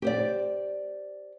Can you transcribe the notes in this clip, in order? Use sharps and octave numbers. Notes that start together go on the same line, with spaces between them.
G4 C5 D5